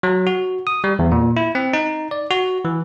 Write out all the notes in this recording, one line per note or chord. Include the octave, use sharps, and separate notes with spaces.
F#3
F#4
D#6
G3
E2
A#2
E4
C4
D#4
D5
F#4
E3